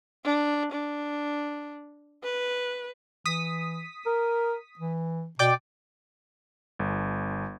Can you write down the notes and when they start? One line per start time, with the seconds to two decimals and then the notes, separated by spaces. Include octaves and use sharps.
0.24 D4
0.72 D4
2.23 B4
3.26 E3 D#6 B6
4.06 A#4
4.79 E3
5.39 B2 D5 G5 D6
6.79 G1